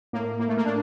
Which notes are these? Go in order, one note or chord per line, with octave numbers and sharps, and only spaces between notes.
A2 A#3
A2 A#3
A3
A#3
A2 D4